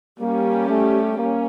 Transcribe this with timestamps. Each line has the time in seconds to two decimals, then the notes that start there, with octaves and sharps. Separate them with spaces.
0.20 G3 A#3 C#4 G4
0.69 A3
1.18 A#3 C#4